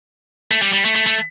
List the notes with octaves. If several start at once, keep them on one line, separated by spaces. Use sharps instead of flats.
A3
G3
G3
A3
A3
A3